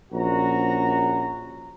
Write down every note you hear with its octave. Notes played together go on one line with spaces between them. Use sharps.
A#1 C#4 F#4 A#5